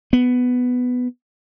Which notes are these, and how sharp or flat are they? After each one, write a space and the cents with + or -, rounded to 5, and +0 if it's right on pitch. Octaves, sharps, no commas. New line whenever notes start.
B3 +10